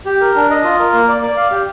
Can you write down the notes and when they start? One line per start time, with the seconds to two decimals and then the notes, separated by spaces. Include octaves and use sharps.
0.06 G4
0.21 A#4
0.36 D4
0.51 D#5
0.64 F4
0.79 A#4
0.93 A#3
1.08 D5
1.23 D5
1.37 F5
1.51 G4